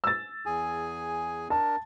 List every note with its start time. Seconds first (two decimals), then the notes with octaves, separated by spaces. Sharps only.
0.04 E6 A6
0.46 E2 G#4 G#5
1.50 D4 A#4 A5